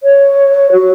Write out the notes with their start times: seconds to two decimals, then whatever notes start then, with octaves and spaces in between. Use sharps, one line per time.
0.03 C#5
0.72 F#4